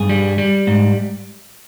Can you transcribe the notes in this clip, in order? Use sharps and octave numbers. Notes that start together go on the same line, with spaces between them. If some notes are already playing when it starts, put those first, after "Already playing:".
Already playing: G2 G#4
G3
G3
G#2